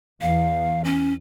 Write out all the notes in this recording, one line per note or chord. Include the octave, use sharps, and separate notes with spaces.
E2 F5
C#4